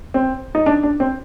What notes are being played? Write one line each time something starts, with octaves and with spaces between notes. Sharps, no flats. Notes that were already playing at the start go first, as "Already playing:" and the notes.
C4
D#4
D4
D4
C4